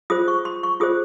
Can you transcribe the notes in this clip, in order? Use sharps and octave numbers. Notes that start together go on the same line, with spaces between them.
F4 G#4 C5 D#6
C#6
C6
C#6
F4 G#4 C5 D#6